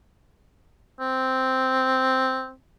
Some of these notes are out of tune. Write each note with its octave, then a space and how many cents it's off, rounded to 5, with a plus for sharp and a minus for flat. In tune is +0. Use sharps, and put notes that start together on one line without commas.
C4 -5